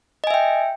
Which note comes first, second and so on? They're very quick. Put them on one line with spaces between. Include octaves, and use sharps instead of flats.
D#5 G#5 E5 G5